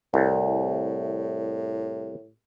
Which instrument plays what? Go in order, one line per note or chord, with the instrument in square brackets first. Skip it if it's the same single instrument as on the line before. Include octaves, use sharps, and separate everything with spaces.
[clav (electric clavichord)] C2 [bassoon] A2